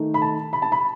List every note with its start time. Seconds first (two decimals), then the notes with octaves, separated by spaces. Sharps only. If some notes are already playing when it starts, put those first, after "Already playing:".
Already playing: D#3 A3 D#4
0.14 B5
0.22 A5
0.53 B5
0.62 A5
0.72 B5